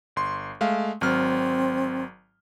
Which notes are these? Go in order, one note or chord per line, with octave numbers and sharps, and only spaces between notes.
G1 C6
G#3 A3 F5
G#1 F#3 C4 F6